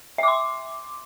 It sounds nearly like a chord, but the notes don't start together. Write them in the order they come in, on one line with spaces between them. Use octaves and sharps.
E5 D6 C6